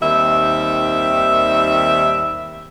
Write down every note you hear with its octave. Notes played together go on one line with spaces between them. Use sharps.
D#2 D#3 G3 C4 E5